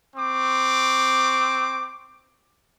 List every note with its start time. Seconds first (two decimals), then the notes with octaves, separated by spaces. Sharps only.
0.16 C4 C#6 D6